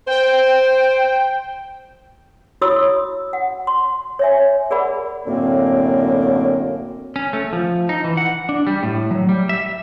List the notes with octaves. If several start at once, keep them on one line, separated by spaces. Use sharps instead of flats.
C5 G5
E4 F#4 C#5 B5 D#6 E6
F#5
C6
C#5 E5 G#5
G#4 A#4 D5 F#5 B5
F#2 A2 D3 A#3 C4
C#4
A3
F3
D#4
E3
F#5
D4
G3
A2
F#3
G3
E5